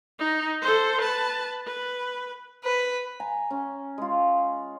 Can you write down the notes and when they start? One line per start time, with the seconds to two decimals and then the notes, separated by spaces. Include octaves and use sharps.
0.20 D#4
0.62 A4 C5
1.01 B4 A5
1.67 B4
2.64 B4
3.20 G#5 A#5
3.51 C#4
3.98 G#3 F4